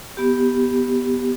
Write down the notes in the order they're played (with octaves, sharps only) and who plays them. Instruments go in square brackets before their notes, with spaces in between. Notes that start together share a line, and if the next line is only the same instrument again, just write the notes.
[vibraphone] B3 G4